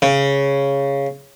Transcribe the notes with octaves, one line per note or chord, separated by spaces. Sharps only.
C#3